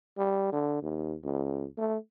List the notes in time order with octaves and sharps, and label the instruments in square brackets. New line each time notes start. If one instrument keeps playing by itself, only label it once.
[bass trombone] G3
D3
D#2
C#2
A3